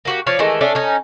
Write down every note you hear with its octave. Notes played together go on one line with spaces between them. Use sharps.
A#3 F#4 G4
F3 C#5 D5 F5
D#3 E3 G#3 A3
A3 C#4 D4
C#4 D#4